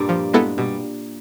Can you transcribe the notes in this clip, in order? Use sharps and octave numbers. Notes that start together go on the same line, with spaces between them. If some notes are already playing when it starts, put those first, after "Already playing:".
Already playing: G2 A#2 G3 A#3
F3
G#3 B3 E4 A4
B2 G3